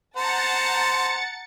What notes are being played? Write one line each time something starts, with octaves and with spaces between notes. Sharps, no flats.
C5 F#5 A5 A#5 A6 C#7